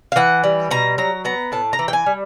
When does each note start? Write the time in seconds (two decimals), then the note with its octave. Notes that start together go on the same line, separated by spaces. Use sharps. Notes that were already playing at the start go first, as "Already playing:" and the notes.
0.12 F5
0.16 E3 F#5
0.44 G3
0.71 B2 A#5
0.98 F#3 A#5
1.25 B3 A#5
1.52 A2 A5
1.73 A#5
1.79 E3
1.88 G5
1.93 G#5
2.06 G3